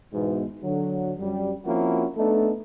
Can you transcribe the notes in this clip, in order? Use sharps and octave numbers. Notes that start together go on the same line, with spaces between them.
G#2 B2 E3
D3 F#3
F#2 G3
F3 A#3 C4 C#4 E4 F#4
A3 B3 D4 D#4 A4